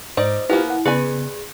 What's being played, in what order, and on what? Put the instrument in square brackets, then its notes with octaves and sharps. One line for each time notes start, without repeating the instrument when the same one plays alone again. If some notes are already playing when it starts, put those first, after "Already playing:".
[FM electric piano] G#2 [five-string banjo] D#4 D5 [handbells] C5
[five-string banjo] A#3 B3 [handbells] E4 [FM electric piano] F4 G4 B4
[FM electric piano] F#5
[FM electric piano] C#3 B3 [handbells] G#4 [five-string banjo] B4 D5 G#5